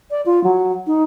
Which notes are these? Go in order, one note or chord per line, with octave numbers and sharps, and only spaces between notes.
D5
F4
F#3
D#4